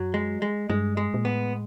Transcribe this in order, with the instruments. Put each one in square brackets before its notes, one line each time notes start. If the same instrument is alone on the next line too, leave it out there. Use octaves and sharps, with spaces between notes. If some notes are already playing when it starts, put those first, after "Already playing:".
Already playing: [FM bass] F#2 [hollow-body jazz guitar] F#3
[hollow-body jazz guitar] G#3
G#3
[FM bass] G2 [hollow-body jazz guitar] G#3
[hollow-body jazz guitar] G#3
[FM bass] A#2
[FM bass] A2 [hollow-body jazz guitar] B3